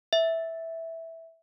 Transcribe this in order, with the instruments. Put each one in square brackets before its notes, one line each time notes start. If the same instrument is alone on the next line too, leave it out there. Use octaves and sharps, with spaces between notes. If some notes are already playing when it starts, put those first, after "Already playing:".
[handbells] E5